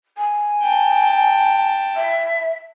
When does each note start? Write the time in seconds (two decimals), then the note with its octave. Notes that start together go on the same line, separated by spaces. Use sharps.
0.17 G#5
0.62 G5 A5
1.96 E5